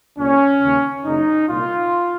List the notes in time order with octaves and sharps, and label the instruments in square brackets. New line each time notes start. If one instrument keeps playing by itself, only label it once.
[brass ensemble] C2 A#2 C#4
D#2 C#3
F#1 F#2 C#3 D#4
C2 A#2 F4